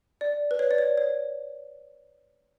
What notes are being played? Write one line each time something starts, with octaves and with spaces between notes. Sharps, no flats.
D5
B4
C#5
D5
C#5
C#5